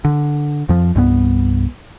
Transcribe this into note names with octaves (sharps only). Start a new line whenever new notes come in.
D3
F2 F3
C2 G2 B3